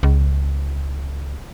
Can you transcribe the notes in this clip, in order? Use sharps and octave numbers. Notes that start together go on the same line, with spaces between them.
C#2